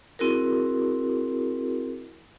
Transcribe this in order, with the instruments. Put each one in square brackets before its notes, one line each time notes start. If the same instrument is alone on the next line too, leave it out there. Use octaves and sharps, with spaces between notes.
[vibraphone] C4 E4 F#4 G#4 A#4